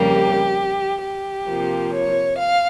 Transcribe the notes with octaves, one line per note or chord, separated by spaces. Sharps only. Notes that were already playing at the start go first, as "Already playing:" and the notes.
Already playing: F2 C#3 G3 A#3 G4
G4
C3 F3 A#3
C#5
F5